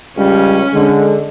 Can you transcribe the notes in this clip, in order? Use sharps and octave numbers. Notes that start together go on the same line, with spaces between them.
C#2 G3 C#4
D3 G#3